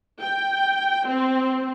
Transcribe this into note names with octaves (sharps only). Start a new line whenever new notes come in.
G5
C4